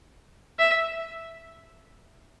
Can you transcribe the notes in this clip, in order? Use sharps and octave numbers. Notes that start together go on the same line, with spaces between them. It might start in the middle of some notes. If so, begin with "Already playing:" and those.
E5